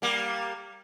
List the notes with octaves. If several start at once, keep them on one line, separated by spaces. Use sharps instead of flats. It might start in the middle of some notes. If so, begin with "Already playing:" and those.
G3 A#3